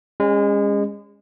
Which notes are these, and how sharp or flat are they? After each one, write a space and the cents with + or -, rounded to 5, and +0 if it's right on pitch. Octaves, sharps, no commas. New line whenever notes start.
G#3 -30 C#4 +0